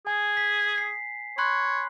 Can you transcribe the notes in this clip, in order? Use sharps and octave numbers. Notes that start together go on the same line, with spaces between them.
G#4 G#5
B6
C7
C#5 B5 C6 F#6